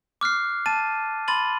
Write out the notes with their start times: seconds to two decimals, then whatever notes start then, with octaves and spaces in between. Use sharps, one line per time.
0.21 D6 F6 F#6 C7
0.66 A5 A6 D#7
1.28 B5 C6 A6 D#7 F#7